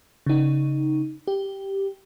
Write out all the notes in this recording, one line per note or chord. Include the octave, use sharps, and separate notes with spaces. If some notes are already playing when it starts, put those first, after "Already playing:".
C#3 D#4
G4